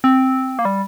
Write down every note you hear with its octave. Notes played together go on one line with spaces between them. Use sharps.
C4
A#3
G3